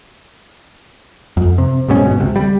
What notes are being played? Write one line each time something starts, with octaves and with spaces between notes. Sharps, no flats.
F2
C3
D1 G#2 B2 C#4
G1 B2
C#2 C3
G3